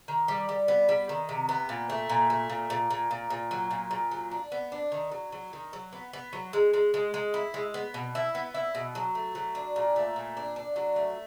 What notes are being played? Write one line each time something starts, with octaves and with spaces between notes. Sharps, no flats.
D#3
G3
G3
B3
G3
D#3
C3
B3
A#2
A3
A#2
A3
A#2
A#2
A#2
A#2
A#2
F#3
A#2
A#2
F#3
D4
B3
D4
D#3
F#3
F#3
D#3
F#3
B3
B3
F#3
G#3
G#3
G#3
G#3
E4
G#3
B3
B2
E4
B3
E4
B2
F#3
A3
F#3
D4
A#2
A3
A#2
D4
D4
F#3
A3